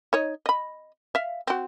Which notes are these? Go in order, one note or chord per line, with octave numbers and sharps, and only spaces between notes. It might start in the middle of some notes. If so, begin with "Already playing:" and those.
D#4 C#5 D#5
D#5 B5
E5 F5
C4 F#4